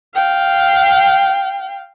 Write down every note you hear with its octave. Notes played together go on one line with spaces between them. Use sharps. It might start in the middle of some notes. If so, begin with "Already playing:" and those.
F5 G5